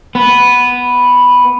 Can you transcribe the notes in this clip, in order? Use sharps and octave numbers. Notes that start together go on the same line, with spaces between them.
B3